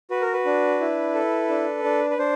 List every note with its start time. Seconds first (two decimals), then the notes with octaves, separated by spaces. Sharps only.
0.11 F#4 B4
0.22 A#4
0.33 B4
0.45 D4
0.80 E4
1.15 A4
1.49 D4
1.84 D4
2.10 B4
2.18 D4 C5